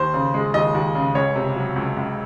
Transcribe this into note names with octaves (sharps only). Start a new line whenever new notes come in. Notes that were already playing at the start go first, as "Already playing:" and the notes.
Already playing: D#2 C5
C#3
G#3
D#2 D#5
D#2
C#3
C#2 C#5
C3
F#3
C#2
C#2